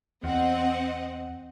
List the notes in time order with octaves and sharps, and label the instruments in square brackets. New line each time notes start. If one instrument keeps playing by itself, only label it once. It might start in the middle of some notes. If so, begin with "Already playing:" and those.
[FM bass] E2 [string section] C4 D#5 F#5